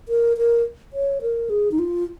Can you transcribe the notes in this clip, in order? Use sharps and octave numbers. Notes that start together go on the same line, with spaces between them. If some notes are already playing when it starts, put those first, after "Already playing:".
A#4
A#4
C#5
A#4
G#4
D#4
F4